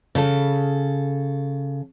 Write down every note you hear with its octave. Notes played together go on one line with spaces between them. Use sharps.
C#3 A4